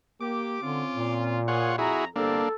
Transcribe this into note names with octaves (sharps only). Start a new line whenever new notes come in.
A#3 G4 D6
D3 C4 C#4 F4
A#2
A#3 F4 G#4 C#5 F#5
F2 E4 F#4 G#4 A#5
G1 C2 A#3 C4 D4 A4